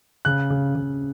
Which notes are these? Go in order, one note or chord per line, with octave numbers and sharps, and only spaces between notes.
C#3 F#6
C#3
C#3